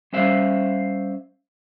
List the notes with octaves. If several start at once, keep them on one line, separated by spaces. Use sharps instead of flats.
G3 C#4 C5 E5 F5